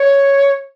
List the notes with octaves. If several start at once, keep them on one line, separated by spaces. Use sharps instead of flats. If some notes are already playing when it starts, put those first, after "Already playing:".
Already playing: C#5